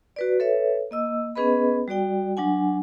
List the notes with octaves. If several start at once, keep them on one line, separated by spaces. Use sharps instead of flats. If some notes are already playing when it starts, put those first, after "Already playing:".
F#4 B4 D5
A4 B4 C#5 E5
A#3 D#5 E6
B3 C#4 G#4 B4 D#5 B5
G3 F#4 D5 G5
F#3 D4 F#5 G#5